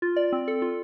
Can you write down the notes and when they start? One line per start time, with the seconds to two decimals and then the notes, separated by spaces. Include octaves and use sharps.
0.02 F4
0.16 D5
0.32 C4
0.48 A4
0.62 F4